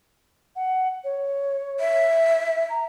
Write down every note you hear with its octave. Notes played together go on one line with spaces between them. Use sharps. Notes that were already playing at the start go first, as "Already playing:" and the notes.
F#5
C#5
E5
A#5